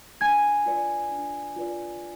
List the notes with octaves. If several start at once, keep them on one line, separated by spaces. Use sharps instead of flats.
D4 G#5 G#6
F4 B4 D5
D4
F4 B4 D5